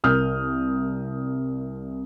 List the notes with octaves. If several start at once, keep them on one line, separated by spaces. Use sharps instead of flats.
C2 A#4 D#6 F6 G6